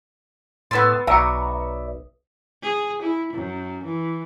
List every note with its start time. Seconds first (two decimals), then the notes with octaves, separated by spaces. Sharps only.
0.71 A2 B3 C#4 B4 C6 E6 A6
1.07 B1 B4 D5 E5 A#5 C#6 D#6
2.63 G#4
3.02 E4
3.34 F#2
3.84 E3